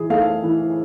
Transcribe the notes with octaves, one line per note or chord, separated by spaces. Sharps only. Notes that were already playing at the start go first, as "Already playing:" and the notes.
Already playing: E3 G#4
A3 F5
E3